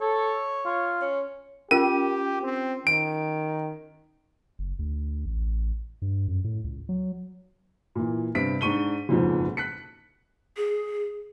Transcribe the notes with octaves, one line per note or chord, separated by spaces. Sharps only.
A4 C#5
F4
C#4
C#4 F4 G4 A#4 D#7
C4
D#3 D7
F#1
D2
A1
G2
F#2
A2
C#2
F#3
A#2 E3
G2 C3 B3 B6 D7
G#2 D4 C#6 D#7 G7
F#1 F2 G#2 B2 F3
F#6 B6 C#7
G#4